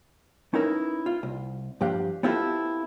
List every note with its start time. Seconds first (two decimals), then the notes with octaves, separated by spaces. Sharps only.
0.54 C#4 D#4 E4 A#4 B4
1.06 F4
1.23 C2
1.81 G2 F3 G4 F5 F#5
2.23 B3 C4 E4 F4 G4 A4